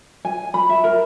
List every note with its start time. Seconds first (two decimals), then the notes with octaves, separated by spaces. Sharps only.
0.25 G#5
0.54 B5
0.69 E5
0.84 A#4